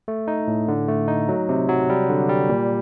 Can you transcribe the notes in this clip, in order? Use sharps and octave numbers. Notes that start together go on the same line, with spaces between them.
A3
D#4
A2
D3
A3
D#4
F#3
C3
F#3
G3
D3
G3
A#2